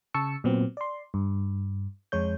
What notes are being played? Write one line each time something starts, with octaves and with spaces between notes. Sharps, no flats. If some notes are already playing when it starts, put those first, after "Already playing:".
C#3 A5 C#6 E6 C#7
A#2 F#3 B3 C4
D5 C6
G2
F2 G#3 C#5 G6